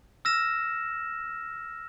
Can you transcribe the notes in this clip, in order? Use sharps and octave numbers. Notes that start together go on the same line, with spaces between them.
E6 F6 A#6 E7